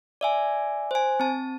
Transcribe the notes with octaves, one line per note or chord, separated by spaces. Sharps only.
D5 E5 G#5
C5 G#5
C4 A5